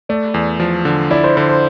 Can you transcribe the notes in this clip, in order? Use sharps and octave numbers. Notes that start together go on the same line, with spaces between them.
A3 D5
E2
F3
D3
E4 D5
C5
D3 C5
C5